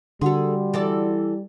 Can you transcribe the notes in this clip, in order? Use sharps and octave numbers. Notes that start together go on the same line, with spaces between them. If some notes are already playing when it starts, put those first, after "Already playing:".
D3 G3 F#4 G#4 A4 F#5 C6
E3 A4 D5